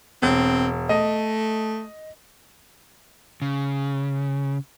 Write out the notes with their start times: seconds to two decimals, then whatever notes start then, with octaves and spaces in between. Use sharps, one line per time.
0.22 E1 C4
0.89 A3 D#5
3.42 C#3